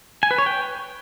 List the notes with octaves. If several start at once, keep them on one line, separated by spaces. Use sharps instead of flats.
G#5
B4
C#5
G5